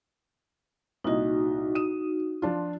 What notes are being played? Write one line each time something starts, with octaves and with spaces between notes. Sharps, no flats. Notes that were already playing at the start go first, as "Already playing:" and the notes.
C2 A#2 D#4 F#4 D#5
D#6 D#7 E7
F3 D4 F4